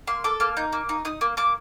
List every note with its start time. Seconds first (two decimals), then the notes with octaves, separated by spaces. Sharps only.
0.07 A#3 C6
0.24 A4 D6
0.40 A#3 F6
0.57 D#4 G6
0.73 A#3
0.89 D#4
1.05 D#4 D#6
1.21 A#3
1.37 A#3 D6